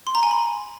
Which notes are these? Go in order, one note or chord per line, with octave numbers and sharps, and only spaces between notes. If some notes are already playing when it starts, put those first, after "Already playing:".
C6
A#5
G#5
B5